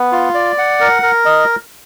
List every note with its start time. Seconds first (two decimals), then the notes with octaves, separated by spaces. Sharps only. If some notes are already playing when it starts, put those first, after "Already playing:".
Already playing: B3
0.12 F4
0.34 D5
0.58 F#5
0.80 A#4
1.02 A#4
1.25 D#5